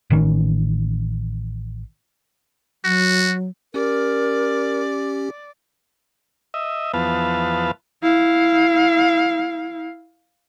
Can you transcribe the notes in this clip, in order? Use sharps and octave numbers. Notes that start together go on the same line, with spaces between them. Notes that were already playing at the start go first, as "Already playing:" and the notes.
A1 D#3 C#4
F#3 F#4
C#4 G4 A#4 D5
D#5 E5
E2 F3 B3 B4 F5 A5
E4 F5